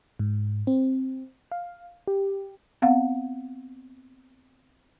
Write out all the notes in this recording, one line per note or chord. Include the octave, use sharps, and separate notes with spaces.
G#2
C4
F5
G4
B3 C4 F5 F#5